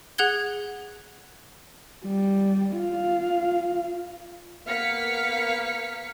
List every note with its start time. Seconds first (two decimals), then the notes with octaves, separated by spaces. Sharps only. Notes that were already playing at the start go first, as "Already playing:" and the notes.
0.18 G#4 F#5 F#6 G#6 G7
2.05 G3
2.78 F4 F5
4.66 A#3 B3 F5 F6 B6 C#7